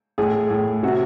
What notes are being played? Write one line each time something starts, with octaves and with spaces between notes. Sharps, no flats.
A2 G#4
A2
C3 F#4